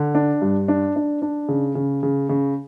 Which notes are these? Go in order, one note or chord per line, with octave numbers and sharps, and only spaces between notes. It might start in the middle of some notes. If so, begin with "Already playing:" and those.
Already playing: D3
D4
G2
D4
D4
D4
C#3
C#3
C#3
C#3